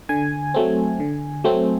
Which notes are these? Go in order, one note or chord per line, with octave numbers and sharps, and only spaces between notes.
D3 G#5
F#3 A3 C4
D3
F#3 A3 C4